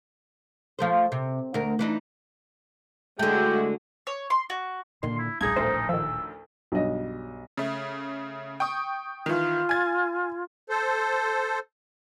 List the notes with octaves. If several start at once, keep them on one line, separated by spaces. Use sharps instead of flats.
F3 A3 C5
C3
D2 A#4
E3 D4 D#4
D3 G#3 A3 E4 F#4 G5
C#5
C6
F#4
A#2 D3 D#3 C6
E4
D1 A#1 G2 D#4 G#4 G#6
A1 D2 A#4 C5
D#3 F3 E6
B1 G2 D#5
C#3 A3
G5 C#6 D#6
D#3 E3 F4
G#5 G#6 A6
A4 C5